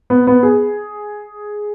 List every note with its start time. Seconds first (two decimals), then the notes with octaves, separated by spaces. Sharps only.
0.10 B3
0.27 B3
0.43 G#4